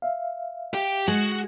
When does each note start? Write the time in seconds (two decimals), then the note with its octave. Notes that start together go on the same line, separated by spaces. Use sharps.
0.02 E5 F5
0.74 G4 G5
1.08 G#3 F#4